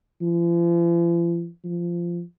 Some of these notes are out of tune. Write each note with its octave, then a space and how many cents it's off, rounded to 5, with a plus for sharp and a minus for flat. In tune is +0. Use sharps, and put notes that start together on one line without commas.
F3 -45
F3 -15